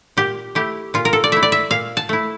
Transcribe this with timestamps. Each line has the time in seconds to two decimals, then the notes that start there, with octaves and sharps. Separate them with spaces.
0.17 A#2 G4
0.55 A3 E4 G4
0.94 A#2 F4
1.05 A#4
1.13 A4
1.24 D5
1.32 A3 E4 E5
1.43 D5
1.52 E5
1.71 A#2 F5
1.97 A5
2.09 A3 E4